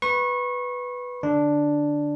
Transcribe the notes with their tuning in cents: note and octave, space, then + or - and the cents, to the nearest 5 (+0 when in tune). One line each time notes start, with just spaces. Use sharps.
B4 +0 C#6 -30
D3 +5 D4 +0